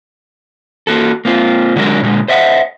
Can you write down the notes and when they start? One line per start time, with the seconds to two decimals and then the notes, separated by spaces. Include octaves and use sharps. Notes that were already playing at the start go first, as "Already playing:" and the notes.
0.87 A#3 F#4 A4
1.25 A#3 C4 F4
1.76 D3 F#3 G#3 D4 A#4
2.02 A#2 D3 G3 G#3
2.28 C5 D#5 E5 F#5